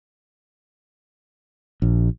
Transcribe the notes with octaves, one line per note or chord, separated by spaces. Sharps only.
A#1